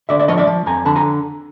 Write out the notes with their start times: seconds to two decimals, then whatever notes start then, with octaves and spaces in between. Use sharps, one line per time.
0.09 D3 D5 E5
0.19 D5 E5
0.28 F3 C#5 D#5
0.38 D5 E5
0.47 F3
0.66 F2 G#5 A#5
0.85 D3 A5 B5
0.95 G#5 A#5